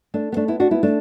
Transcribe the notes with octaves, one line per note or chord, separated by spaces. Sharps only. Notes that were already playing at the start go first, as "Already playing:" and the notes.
A3 D4
B3
A3 D4
B3 E4
D4 F#4
B3 E4
A3 D4